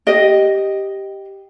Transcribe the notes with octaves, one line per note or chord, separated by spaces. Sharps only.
G4 D#5